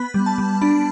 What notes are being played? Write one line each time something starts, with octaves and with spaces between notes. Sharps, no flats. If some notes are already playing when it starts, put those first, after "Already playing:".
Already playing: B3 B5
G3
A5
G3
D4 B5